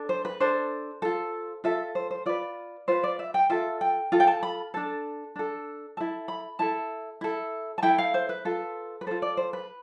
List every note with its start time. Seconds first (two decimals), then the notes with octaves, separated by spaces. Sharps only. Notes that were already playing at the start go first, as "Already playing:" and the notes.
Already playing: D4 A4
0.09 C5
0.25 B4
0.40 D4 A4 C5
1.02 F4 A4
1.64 F4 A4 E5
1.95 C5
2.11 C5
2.26 F4 B4 D5
2.88 F4 B4 C5
3.04 D5
3.19 E5
3.34 G5
3.50 F4 A4 E5
3.81 G5
4.12 F4 A4
4.20 G5
4.27 A5
4.43 B5
4.74 D4 A4
5.36 D4 A4
5.97 E4 A4 A5
6.28 B5
6.59 E4 A4 A5
7.21 E4 A4
7.78 A5
7.83 E4 A4 G5
7.98 F5
8.14 C5
8.29 B4
8.45 F4 A4
9.01 B4
9.07 F4 A4 C5
9.22 D5
9.37 C5
9.53 B4